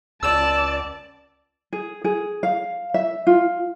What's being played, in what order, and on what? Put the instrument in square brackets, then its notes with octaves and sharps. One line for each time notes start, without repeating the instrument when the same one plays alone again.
[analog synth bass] C#2 [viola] D5 [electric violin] A5 [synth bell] E6 E7
[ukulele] G#4
G#4
F5
E5
F4